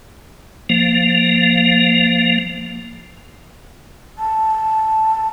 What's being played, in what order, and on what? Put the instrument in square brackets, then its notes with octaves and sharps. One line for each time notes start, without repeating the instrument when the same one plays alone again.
[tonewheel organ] F3 A#3
[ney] A5